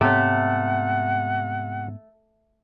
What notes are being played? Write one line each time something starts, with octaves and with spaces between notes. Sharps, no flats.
G#2 C3 A3 B3 C#5 F#5